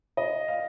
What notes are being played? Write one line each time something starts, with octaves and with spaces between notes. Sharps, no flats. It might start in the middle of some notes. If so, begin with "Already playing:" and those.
D#5
F5